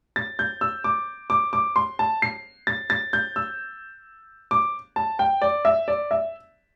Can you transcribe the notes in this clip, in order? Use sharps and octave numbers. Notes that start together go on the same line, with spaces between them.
A6
G6
E6
D6
D6
D6
C6
A5
C7
A6
A6
G6
E6
D6
A5
G5
D5
E5
D5
E5